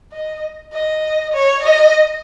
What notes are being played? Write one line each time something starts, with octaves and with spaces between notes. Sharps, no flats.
D#5
D#5
C#5
D#5